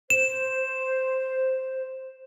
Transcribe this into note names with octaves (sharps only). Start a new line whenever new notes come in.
C5 E7